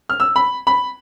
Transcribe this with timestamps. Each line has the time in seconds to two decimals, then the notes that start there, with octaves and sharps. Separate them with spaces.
0.10 F6
0.20 E6
0.36 B5
0.67 B5